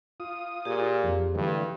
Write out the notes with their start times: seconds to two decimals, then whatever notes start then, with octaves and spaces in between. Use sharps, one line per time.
0.20 F4 D#6
0.65 A#2 G4 G#4
1.04 F2
1.35 G2 D3 E3 A3